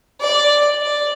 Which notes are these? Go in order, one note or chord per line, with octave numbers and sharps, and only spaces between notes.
D5
D5